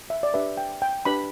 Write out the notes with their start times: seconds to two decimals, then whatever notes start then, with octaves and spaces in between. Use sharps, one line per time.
0.10 E5
0.23 D5
0.34 D4 G4 B4 E5
0.57 G5
0.82 G5
1.05 D4 G4 B4 B5